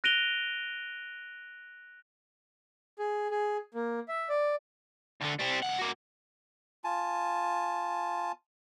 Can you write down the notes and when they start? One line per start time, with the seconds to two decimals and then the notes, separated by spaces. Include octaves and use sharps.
0.04 F#6 A#6 D7 D#7 F7 G7
2.99 G#4
3.31 G#4
3.74 A#3
4.09 E5
4.29 D5
5.21 D2 D3
5.39 G3 C4
5.62 C#2 F#5
5.78 A#3 F#4
6.84 F4 G#5 A5